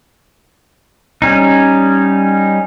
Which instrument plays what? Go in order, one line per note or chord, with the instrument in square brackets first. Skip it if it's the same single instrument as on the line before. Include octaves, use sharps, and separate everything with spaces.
[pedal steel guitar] G3 C#4 D#4